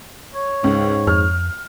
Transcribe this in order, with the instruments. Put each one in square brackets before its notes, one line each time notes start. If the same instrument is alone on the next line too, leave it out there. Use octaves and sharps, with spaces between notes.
[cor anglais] C#5
[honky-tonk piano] C#2 [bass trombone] G#2
[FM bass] F2 [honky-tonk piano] F6